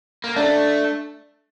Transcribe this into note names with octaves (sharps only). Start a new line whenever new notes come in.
A#3
A3 D4